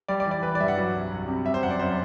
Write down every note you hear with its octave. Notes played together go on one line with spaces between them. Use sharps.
G3 D5
D5
E3
D5
E3 B4
D5
G2 E5
F#5
F#3
C2
C2
C3
G3 E5
C5
F#2 F#5
D5
F#2 C5